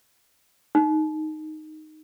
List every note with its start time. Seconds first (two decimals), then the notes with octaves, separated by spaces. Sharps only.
0.75 D#4